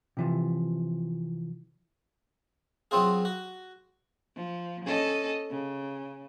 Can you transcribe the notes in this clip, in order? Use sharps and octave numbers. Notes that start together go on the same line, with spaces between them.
C3 E3 F3
F#3 B3 C4 F4 G#4
F#4
F3
C#4 A4 D#5
C#3